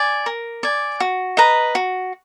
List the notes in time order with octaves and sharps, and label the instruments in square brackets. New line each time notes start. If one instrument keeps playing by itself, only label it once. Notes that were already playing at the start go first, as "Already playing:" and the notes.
Already playing: [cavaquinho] D5 G#5
A#4
D5 G#5
F#4
B4 D#5 A#5
F#4